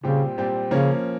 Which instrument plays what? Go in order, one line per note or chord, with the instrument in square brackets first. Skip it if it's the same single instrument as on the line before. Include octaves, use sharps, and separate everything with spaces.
[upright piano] A#2 G3 C4 G4 [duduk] C#3
[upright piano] A#2 G3 C4 G4
[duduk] C#3 [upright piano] F3 A#3 C#4